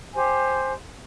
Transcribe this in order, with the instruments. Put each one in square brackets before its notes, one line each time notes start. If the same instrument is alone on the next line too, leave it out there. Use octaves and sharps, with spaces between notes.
[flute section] G4 C5 G#5